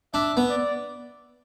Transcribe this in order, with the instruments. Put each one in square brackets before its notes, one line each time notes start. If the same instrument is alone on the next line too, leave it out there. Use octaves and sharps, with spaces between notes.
[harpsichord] D4 [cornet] E5
[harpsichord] B3
[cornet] D5